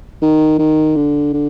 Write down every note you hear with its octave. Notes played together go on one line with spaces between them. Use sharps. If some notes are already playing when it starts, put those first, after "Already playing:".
D#3
D#3
D3
D3